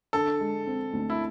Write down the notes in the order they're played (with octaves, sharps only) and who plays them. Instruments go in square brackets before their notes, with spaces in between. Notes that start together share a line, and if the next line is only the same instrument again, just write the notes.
[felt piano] D3 [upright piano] A4
[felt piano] G#3
C4
D2
[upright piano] E4